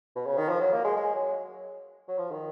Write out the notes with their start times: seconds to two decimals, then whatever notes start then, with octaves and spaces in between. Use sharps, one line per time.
0.16 B2
0.26 C#3
0.38 D#3
0.49 F3
0.60 F#3
0.72 A#3
0.84 G#3
0.96 G#3
1.15 F#3
2.08 F#3
2.18 F3
2.31 D#3